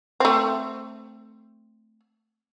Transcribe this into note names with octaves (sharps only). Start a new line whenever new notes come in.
A3 C4